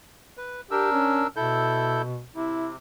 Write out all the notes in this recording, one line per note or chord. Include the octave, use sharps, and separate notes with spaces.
B4
D4 G4 A#4 E6
C#4
B2 E4 A4 G6
C3 E4